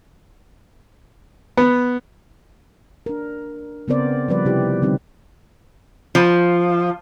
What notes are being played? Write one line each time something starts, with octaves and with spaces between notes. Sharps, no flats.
B3
D4 A#4
C#3 B3 C4 A#4 C5 D5
F3 G3 B4 D5
C3 D#4 E4 G4
D3 G3 C4 D#4 G4
F3